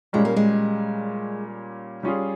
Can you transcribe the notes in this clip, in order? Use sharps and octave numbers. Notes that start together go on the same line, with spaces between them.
A#2 G3 G#3 C#4
A#3
G#3
G3 C#4 F4 G#4